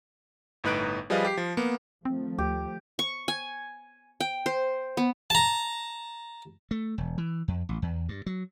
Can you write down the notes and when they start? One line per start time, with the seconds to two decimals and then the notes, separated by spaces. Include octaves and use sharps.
0.64 G1 A2 D#4 B4 F#6 D7
1.10 F3 G3 G#4 B4 D#5 F5
1.25 G4 C7
1.37 F3
1.57 A#3 B3
2.05 D#3 F3 A3 C4
2.38 D2 G4
2.99 C#6
3.28 G#5
4.20 G5
4.46 C5
4.97 B3
5.30 A5 A#5
6.71 A3
6.98 E1
7.18 E3
7.48 F2
7.69 A1
7.82 E2
8.09 G2
8.26 F#3